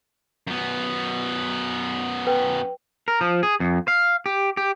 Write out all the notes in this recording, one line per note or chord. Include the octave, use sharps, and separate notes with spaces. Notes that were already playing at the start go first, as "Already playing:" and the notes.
F#2 B3
B4 G5
A#4
F3
G#4
F2
F5
G4
G4